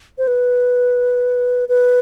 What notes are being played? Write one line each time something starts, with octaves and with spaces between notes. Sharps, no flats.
C5
B4
B4